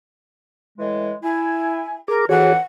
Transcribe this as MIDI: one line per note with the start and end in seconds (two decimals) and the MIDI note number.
0.78 1.11 45
0.78 1.11 52
0.78 1.11 56
1.23 1.95 64
1.23 1.94 80
2.08 2.25 68
2.08 2.25 70
2.08 2.25 86
2.29 2.52 41
2.29 2.52 45
2.29 2.52 52
2.29 2.53 66
2.29 2.53 68
2.29 2.53 73
2.29 2.58 78